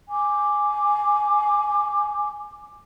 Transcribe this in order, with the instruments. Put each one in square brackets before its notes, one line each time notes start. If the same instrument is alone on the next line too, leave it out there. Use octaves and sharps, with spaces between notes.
[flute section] G#5 D6